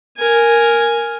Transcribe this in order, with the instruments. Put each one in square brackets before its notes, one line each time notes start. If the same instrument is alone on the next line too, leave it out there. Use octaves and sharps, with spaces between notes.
[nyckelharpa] A#4 G#5